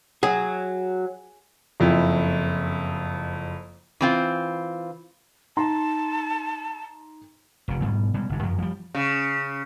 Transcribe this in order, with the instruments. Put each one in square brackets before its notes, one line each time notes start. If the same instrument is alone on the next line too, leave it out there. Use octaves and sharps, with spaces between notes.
[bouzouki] F#3 [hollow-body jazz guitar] G#4
[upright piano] F#1 F2 E4
[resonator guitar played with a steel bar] E3 C4 F4
[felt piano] D#4 A#5 C6 [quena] A5
[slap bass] F1 C3
G#2 B2 G3 B3
B2 G3 G#3
G1 G#2
F#2 F3 F#3
F3 G3
[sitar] C#3